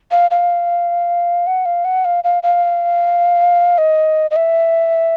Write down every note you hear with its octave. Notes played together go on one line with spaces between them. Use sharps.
F5
F5
F#5
F5
F#5
F5
F5
F5
D#5
D#5
E5